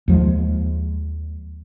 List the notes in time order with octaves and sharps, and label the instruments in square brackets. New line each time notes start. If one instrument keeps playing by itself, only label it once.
[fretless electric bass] D#2 F3 G#3